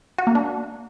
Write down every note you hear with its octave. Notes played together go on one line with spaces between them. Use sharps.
F#4
A#3
D4